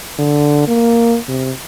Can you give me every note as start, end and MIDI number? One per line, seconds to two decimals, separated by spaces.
0.19 0.64 50
0.68 1.17 58
1.29 1.52 48